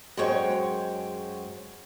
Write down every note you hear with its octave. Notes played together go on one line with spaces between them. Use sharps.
F#2 G#3 C5 C#5 G5